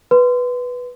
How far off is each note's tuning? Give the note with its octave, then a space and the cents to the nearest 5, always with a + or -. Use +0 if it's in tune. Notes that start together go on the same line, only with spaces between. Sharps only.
B4 +0 C6 -25